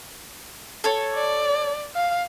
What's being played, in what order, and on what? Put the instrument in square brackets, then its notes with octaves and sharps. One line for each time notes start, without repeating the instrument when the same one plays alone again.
[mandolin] A4 C#5
[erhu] D5
F5